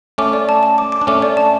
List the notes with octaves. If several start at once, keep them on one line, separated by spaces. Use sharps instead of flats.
A3 C#4 D6
D5
A5
A5
D6
D6
D4
A3 C#4 D6
D5
A5